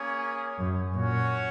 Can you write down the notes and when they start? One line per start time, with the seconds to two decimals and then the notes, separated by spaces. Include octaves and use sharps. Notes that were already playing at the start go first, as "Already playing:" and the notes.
Already playing: A#3 C#4 G#4 C#5
0.59 F#2
0.94 A#2 C#4 F#4 C#5